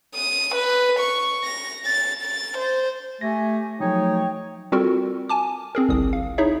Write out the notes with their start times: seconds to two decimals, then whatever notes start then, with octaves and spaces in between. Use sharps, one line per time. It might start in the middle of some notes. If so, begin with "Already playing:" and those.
0.14 D#6
0.55 B4
0.99 C#6
1.44 A#6
1.86 A6
2.23 A6
2.58 C5
3.21 A3 G4 G#5 A#6
3.80 F3 F#3 A3 D#4 C#5 G5
4.72 G3 C4 F4 F#4 A4 A#4
5.29 G#5 A5 D6
5.75 C4 G#4 A#4
5.89 G1 C2 D#6
6.13 F5
6.38 D#4 E4 G#4 C#5 E5